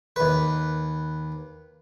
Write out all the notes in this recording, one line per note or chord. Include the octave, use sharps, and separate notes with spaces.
D#2 B4